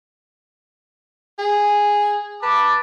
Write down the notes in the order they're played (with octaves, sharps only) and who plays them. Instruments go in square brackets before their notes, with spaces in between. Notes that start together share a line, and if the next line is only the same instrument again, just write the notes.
[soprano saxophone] G#4
[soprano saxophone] B4 [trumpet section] A5 D6